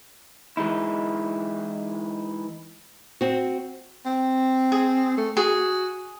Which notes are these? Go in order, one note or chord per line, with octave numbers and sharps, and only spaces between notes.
E3 G#3 D#4 E4
C4 F#4
C4
G#4
A3
F#4 G#4